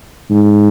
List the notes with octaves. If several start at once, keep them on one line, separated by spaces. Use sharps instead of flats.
G#2